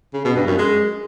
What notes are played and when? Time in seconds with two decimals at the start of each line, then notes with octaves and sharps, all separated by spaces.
0.13 C#3
0.24 B2
0.36 G2
0.47 F#2
0.58 G#3